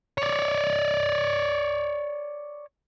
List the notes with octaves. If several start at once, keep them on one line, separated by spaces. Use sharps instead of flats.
C#5 D5